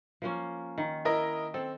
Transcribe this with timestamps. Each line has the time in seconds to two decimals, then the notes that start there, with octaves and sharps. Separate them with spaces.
0.22 F3 A#3 C#4
0.78 D#3
1.05 E4 A#4 D#5
1.54 C4 A4